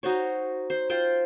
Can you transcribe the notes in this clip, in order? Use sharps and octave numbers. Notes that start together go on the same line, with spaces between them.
D#4 F#4 C5 C#5
C5
F4 C5 G5